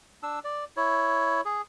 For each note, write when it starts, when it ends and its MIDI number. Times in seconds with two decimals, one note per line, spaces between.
0.23 0.39 62
0.23 0.39 88
0.44 0.65 74
0.77 1.41 64
0.77 1.41 73
1.45 1.62 68